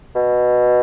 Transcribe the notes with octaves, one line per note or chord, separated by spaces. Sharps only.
B2